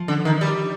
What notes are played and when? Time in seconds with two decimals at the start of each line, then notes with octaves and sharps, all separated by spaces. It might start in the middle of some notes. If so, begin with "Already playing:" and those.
Already playing: F3
0.08 D3
0.25 D#3
0.41 G3